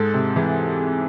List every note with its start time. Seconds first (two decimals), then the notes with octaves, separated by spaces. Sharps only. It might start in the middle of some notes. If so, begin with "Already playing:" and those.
Already playing: G#2 G#3 A4
0.14 C3
0.36 E3 G#4